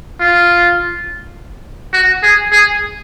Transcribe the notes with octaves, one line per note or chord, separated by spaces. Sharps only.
F4
F#4
G#4
G#4